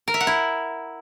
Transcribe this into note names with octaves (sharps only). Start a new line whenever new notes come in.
A#4
E5
F#5
E4